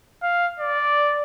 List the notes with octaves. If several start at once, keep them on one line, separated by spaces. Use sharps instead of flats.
F5
D5